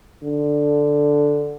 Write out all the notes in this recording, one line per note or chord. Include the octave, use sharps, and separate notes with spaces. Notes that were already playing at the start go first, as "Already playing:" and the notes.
D3